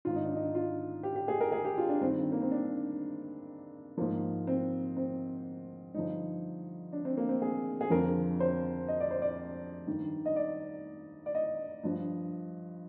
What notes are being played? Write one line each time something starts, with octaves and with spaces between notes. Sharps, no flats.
G#2 D#3 F4
D#4
D4
D#4
F4
G4
G4
G#4
A#4
G#4
G4
F4
D4
G2 D#3 C4
A#3
C4
D4
G#2 F3 A#3
C4
C4
G2 D3 F3 D#4
D4
C4
A#3
C4
G#4
G#4
F2 D3 F3 A#4
C5
D#5
D5
C5
D5
G2 D#3
D#5
D5
D5
D#5
G2 F3